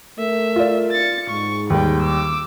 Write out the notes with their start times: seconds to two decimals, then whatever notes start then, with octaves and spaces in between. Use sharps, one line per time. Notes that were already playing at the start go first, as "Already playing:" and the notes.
0.19 A3 A#4 E5
0.56 F4 D5
0.92 A6 C#7
1.30 G#2 C#6
1.70 D#2 G3 B4 G5
2.02 D6 E6